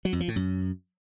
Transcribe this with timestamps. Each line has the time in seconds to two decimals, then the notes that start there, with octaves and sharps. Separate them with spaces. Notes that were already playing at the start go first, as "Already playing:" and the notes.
0.05 F#3
0.13 F2
0.20 F3
0.28 A2
0.36 F#2